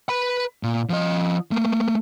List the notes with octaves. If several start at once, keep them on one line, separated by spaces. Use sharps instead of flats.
B4 B5
A#2
F3 D#5
A3 A#3